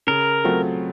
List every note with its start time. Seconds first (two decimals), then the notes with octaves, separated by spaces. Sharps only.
0.07 C#3 A#4
0.44 F#3 A3 C4 F4